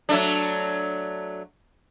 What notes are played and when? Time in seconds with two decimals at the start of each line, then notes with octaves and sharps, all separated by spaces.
0.09 F#3 A3 D4